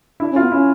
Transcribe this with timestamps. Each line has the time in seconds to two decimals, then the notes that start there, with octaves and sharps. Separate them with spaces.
0.20 D4 E4
0.31 C#4
0.36 F4
0.41 B3
0.52 C#4 E4